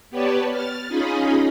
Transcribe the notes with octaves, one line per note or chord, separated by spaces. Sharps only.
B3 G4 B4 C#5 D5 A5
F6 A6
C#4 D#4 F4 G#4 D#5 B5